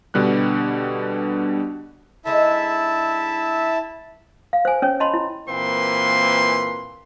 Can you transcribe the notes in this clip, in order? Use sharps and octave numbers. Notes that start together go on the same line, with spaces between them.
B2 D3 G3 D4 F#6
D3 G#3 D#4 E4 E5 A5
F5
C5 G#5
C#4 C#5
D#5 A5 B5 C6
E4
A#2 E3 A#3 C4 B4 C6